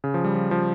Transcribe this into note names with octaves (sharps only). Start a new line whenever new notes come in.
C#3
F3
G3
F3
F3